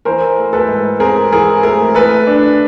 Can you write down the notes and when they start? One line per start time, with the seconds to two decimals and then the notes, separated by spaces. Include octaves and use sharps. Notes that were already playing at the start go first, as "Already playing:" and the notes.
0.05 E3 A#4 C5
0.38 A3
0.53 A4 B4
0.68 G#2
1.00 C4 G#4 A#4
1.31 E3 G#4 A#4
1.63 A3 G#4 A#4
1.95 A3 A4 B4
2.27 D4